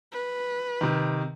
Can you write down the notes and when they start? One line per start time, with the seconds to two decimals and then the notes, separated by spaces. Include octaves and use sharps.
0.12 B4
0.81 C3 D#3